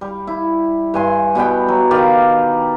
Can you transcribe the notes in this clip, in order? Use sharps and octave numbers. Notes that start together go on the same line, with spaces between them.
G3
E4
G2 G#5 C6
B2 G3 B3 G5
F#3
D#3 G4 D5 F5